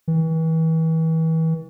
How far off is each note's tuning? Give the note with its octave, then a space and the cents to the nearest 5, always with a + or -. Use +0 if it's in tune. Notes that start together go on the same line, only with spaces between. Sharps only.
E3 -35